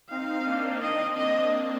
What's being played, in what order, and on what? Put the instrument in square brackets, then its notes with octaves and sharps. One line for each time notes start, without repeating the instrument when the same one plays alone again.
[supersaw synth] C4 D#4 [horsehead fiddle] F5
[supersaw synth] A#3 D4
[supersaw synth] C4 [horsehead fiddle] D#5
[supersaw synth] A#3 D4 [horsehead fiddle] D#5